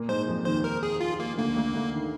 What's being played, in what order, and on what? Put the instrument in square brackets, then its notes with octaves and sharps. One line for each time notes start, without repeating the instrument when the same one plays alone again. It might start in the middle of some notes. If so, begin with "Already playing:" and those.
Already playing: [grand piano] A#2 A#3
[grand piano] G#2 G#3 [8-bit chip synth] C5
[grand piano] F2 F3
[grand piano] D#2 D#3 [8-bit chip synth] C5
[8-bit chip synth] A#4
G#4
F4
A#3
[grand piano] D2 D3 [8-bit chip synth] A#3
[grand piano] D2 D3
D2 D3
D#3